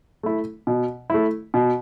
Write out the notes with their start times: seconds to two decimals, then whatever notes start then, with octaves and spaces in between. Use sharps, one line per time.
0.23 A3 E4
0.67 B2
1.10 A3 E4
1.54 B2